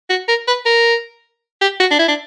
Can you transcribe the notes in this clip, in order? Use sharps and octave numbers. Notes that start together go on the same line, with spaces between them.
F#4
A#4
B4
A#4
G4
F#4
D4
E4
D4